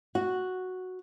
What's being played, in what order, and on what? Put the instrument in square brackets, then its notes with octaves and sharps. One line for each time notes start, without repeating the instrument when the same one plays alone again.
[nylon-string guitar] F#4